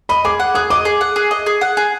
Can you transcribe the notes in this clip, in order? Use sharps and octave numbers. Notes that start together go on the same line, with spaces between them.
D#5 B5
G#4 D6
F#5
G#4 D#6
D#5 D6
G#4
F#5
G#4
D#5
G#4
F#5
G#4